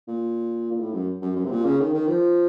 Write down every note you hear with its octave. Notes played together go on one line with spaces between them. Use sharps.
A#2
A#2
A2
F#2
F#2
F#2
C3
A#2
C#3
D#3
D#3
F3